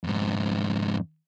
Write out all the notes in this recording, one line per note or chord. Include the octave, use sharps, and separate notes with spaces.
F2 G#2